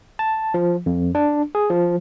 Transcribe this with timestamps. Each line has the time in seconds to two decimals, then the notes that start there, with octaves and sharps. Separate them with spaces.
0.19 A5
0.54 F3
0.86 F2
1.15 D4
1.55 G#4
1.70 F3